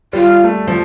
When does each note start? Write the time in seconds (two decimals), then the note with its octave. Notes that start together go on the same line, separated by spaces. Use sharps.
0.13 G3 F4
0.44 A3
0.67 F3